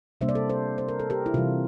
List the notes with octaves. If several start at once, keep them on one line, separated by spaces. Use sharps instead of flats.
C3 G3 A#3 D4 C5 E5
D5
A4 C5
A4 C5
C5
A#4
A4
G4 A#4
E4
C3 E3 G3 F4